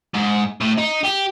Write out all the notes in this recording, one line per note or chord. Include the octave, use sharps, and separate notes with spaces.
G#2
A2
D#4
G4